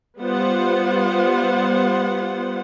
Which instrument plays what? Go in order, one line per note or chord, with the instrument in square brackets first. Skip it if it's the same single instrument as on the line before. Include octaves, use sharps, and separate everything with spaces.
[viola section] G3 B3 F4 C5 F#5